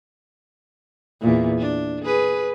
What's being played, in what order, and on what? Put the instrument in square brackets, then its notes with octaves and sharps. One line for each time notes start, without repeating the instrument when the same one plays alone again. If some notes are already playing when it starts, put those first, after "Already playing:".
[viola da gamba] E2 A#2
D4
G#4 B4